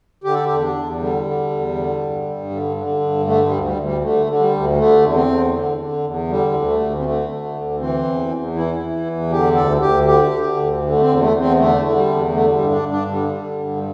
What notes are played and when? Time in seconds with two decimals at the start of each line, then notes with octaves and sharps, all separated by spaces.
0.24 D3 G4
0.34 A4
0.45 E2 G4
0.61 D4
0.75 E2
0.99 D3 G3
1.25 D3
1.50 E2
1.74 D3
2.00 G2
2.26 G2
2.50 D3
2.76 D3
3.00 G2
3.26 D3 A3
3.46 G3
3.52 D2
3.64 G3
3.77 D2
3.83 G3
4.02 D3 A3
4.26 D3
4.39 G3
4.53 D2
4.77 D3 A3
5.02 E2
5.15 C4
5.27 E2
5.53 D3
5.78 D3
6.04 E2
6.28 D3 G3
6.53 D2
6.66 A3
6.79 D2
6.99 C4
7.04 D3 A3
7.29 D3
7.55 D2
7.79 E3 C4
8.04 E2
8.30 E2
8.55 E3 E4
8.80 E3
9.06 E2
9.30 D3 G4
9.55 D2 A4
9.81 D2 G4
10.06 D3 G4
10.31 D3
10.56 D2
10.82 D3
10.92 A3
11.00 C4
11.07 E2
11.20 A3
11.33 E2
11.39 C4
11.57 D3 A3
11.83 D3
11.96 G3
12.07 E2
12.33 D3 A3
12.52 G3
12.58 G2
12.71 D4
12.83 G2
12.90 D4
13.08 D3 G3
13.34 D3
13.59 G2
13.77 G3